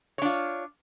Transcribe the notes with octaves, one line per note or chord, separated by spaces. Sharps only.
D4 F4 C#5